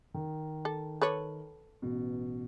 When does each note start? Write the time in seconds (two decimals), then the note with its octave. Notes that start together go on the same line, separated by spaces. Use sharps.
0.14 D#3
0.65 A4
1.02 A4 B4 C#5
1.82 A1 B2